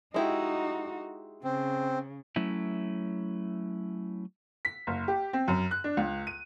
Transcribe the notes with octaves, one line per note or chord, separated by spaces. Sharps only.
G#3 D#4 E4 F#4 G4
C#3 C4
F#3 A3 C#4 E4
B6
F#1
G4
C4
F#2
F#6
D4
C#2
D#7